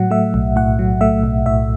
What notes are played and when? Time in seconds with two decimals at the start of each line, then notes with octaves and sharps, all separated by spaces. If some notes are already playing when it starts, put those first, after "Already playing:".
Already playing: A2 F#3 F#5
0.11 A3 E5
0.34 B1
0.56 A2 F#5
0.79 F#3
1.01 A3 E5
1.23 B1
1.46 A2 E5